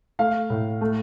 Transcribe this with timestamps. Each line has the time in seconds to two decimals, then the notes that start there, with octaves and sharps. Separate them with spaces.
0.19 A3 F5
0.50 A2
0.81 A3